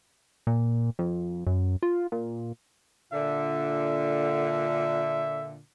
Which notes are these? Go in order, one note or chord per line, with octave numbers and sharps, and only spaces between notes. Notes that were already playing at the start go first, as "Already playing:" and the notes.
A#2
F2
F#2
F4
A#2
A#2 D3 E5